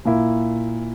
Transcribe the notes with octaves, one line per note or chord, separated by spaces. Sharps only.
A#2 A#3 E4